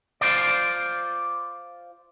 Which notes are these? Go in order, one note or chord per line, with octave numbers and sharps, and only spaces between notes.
F4 C5 D5